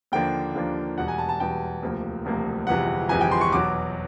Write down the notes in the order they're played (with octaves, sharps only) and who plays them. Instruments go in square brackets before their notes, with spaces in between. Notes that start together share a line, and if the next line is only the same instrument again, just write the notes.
[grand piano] D#2 D3 F3 A#3 D4 G5
D#2 D3 F3 A#3 D4
E1 E2 B2 G3 F#5
G#5
A5
A5
E1 E2 B2 G3 G5
E1 D2 C3 F3 A#3
E1 D2 C3 F3 A#3
G1 F2 C3 E3 G#3 F#5
G1 F2 C3 E3 G#3 G#5
G5
C6
C#6
E2 B2 F#3 D6